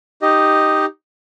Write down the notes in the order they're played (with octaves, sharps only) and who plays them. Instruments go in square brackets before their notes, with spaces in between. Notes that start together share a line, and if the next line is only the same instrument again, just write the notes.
[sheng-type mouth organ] D#4 G4 D#5